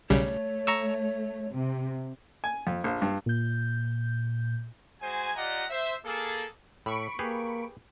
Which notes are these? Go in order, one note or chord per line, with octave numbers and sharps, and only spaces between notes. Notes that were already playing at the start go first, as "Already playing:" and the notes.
B1 C#3 G3 A3 C#5
A#5 C#6 E6
C3
G#5
F2
A#1
G2
A#2 G6
G#3 F#4 C5 G#5
F4 G4 D5 D#5 F#5 A#5
C5 E5
A#3 G#4 A4
A2 B5 C#6 D7
A#3 G4 G#4 B4